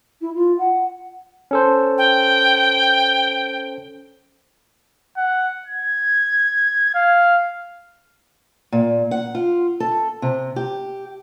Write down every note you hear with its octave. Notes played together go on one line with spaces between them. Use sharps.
E4
F4
F#5
C#4 A4 C5
G5
F#5
G#6
F5
A#2
F#5
F4
A4
C3
G4